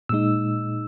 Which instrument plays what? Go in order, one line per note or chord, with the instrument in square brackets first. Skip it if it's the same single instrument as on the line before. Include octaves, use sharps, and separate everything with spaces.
[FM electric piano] A#2 G#3 D#4 E6